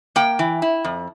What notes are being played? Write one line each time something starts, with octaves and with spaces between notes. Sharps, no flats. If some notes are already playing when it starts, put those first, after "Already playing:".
A#3 G5
E3
E4
F2